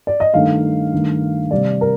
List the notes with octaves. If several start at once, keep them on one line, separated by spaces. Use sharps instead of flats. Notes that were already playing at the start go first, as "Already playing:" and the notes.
D5
D#5
G2 D#3 A3 F5
G2 D#3 A3
C3 G3 D5
A#4